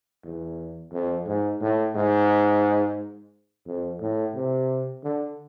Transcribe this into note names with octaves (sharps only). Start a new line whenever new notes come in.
E2
F2
G#2
A2
G#2
F2
A2
C3
D3